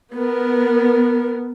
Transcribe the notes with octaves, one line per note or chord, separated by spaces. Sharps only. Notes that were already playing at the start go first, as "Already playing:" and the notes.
B3 A#4